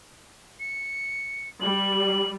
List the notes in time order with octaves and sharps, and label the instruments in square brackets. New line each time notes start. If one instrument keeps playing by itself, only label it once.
[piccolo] C#7
[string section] G3 [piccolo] F#7